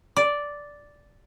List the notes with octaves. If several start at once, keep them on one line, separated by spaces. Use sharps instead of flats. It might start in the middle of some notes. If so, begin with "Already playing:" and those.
D5